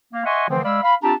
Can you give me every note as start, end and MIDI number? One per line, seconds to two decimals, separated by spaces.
0.13 0.25 58
0.13 0.25 77
0.25 0.47 75
0.25 0.47 76
0.25 0.47 78
0.25 0.47 80
0.25 0.47 84
0.25 0.47 85
0.49 0.64 50
0.49 0.64 52
0.49 0.64 53
0.49 0.64 57
0.49 0.64 60
0.64 0.83 56
0.64 0.83 74
0.64 0.83 77
0.64 0.83 83
0.64 0.83 88
0.84 0.95 77
0.84 0.95 83
1.02 1.13 60
1.02 1.13 62
1.02 1.13 65
1.02 1.13 67
1.02 1.13 81
1.02 1.13 82